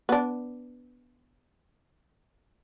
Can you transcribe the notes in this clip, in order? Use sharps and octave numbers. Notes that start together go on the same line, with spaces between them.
B3 D4